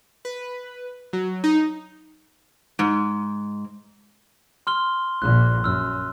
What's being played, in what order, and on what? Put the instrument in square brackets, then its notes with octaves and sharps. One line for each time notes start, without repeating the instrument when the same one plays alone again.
[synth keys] B4
F#3
D#4
[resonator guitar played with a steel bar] G#2
[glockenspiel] C6 F6 G7
[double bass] A#1 A#2 [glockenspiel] F#6
[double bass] F#2 [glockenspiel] E6 F6